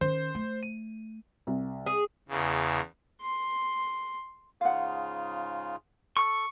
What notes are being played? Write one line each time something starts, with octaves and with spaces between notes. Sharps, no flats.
D#3 C#4 C5
A3
D#7
C2
G#4
E2 C#3
C6
G#2 C#3 F4 F5 F#5
A4 C#6